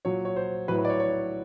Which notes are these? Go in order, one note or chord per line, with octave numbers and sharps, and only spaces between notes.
A#2 F#3 C#5
C#5
C5
A2 F#3 B4
B4
D5
C#5
C#5